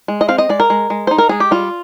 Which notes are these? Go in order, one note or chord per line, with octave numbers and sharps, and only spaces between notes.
G#3
D#5
C4 F5
D#5
G#3 D5
A#4
G#3
G#3
D#4 C5
A#4
G#3 G#4
G4
G3 F4